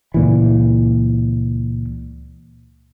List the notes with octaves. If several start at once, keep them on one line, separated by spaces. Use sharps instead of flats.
C#2 A#2 E3